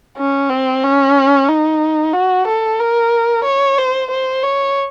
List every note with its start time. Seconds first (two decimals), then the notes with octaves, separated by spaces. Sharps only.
0.18 C#4
0.50 C4
0.83 C#4
1.49 D#4
2.13 F#4
2.47 A4
2.80 A#4
3.44 C#5
3.78 C5
4.11 C5
4.43 C#5